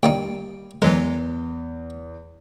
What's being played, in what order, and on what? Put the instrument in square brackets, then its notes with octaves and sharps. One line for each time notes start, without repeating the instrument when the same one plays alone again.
[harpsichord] A#2 D4 D#4 [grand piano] G3 [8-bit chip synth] G5
[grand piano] E2 [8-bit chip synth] E3 F#3 G#3 [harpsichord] A#4